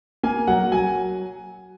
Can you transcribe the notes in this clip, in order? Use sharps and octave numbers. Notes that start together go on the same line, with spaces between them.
A#3 G#5
F#3 F#5
F#3 G#5